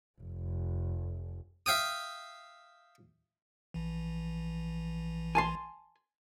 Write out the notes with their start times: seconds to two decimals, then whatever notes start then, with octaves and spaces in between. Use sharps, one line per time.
0.21 F1
1.66 E5 F5 G5 D#6
3.74 A#1 E3
5.35 G#5 A5 C6